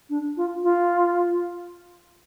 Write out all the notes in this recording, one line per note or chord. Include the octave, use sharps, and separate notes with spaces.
D4
F4
F4